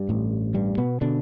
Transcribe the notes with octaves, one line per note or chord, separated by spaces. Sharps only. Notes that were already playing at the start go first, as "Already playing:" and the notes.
Already playing: G2 G3
A1 A2
G2 G3
B2 B3
B2 D3 D4